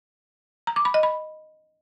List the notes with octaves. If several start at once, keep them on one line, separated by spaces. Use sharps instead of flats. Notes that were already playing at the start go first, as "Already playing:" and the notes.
A#5
D6
B5
D#5
B5